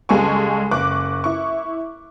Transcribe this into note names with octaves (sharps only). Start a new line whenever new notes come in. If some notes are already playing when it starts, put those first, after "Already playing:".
C#2 G3 G#3 A4 G#5 C#6
F#1 C#6 D6 F#6
E4 C#6